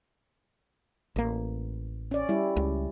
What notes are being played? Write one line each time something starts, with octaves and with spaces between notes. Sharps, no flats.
A1 A#3
C#4 D5
G3 E4
C#2